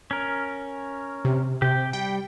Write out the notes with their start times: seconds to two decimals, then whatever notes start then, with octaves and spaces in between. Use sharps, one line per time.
0.11 C#4 A#4
1.25 C3
1.62 C3 G4 G5
1.93 G3 G5